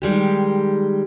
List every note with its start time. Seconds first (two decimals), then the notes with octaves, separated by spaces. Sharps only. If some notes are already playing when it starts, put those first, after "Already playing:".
0.02 D#3 G3 G#3 G4